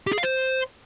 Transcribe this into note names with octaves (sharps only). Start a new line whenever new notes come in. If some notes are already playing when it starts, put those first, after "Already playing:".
G4
G#4
F5
C5